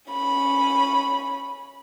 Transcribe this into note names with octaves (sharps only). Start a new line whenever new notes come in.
C#4 B5